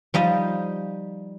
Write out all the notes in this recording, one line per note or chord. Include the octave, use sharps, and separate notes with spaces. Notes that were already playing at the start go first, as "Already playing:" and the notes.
F3 G3 D#4 D#5